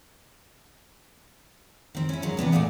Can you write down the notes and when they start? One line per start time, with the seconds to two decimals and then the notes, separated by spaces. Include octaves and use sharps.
1.95 D#3 C4
2.09 C#4 E4
2.22 G#2 F#3 A#4
2.37 C3 E3 B3 D4
2.52 G2 A#2 A3 C#4 D5